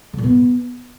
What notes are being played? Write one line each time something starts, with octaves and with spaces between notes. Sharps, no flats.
D3
A#2
B3